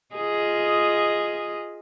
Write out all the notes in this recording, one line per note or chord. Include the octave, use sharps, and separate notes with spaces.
F4 G#4 D#5